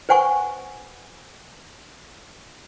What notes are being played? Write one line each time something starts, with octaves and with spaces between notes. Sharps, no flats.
B4 C5 F#5 G#5 C#6